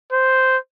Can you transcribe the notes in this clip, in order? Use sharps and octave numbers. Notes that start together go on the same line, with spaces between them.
C5